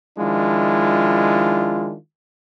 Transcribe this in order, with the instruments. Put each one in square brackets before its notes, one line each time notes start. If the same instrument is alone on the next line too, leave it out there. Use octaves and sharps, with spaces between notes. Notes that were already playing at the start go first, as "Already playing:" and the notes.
[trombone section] D#3 F3 G#3 D4 E4 F4